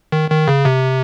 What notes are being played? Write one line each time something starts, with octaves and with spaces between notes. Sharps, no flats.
D#3
D#3
C#3
C3